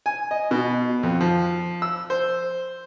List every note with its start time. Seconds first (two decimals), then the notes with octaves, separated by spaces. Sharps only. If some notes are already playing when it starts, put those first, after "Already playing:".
0.06 G#5
0.31 D#5
0.51 B2
1.03 F2
1.21 F3
1.82 E6
2.10 C5